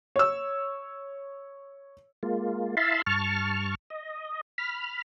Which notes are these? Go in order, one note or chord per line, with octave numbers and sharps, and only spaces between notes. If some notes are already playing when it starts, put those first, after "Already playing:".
C#5 E6
G#3 A#3 F4
E4 E5 F5 A5 B5 C6
G2 A5 C#6 F6
D#5
B5 F6